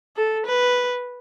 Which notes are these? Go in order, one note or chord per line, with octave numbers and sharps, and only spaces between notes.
A4
B4